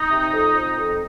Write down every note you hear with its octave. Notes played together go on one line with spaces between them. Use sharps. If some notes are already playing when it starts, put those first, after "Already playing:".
Already playing: D#4
C3
F2
F2
F2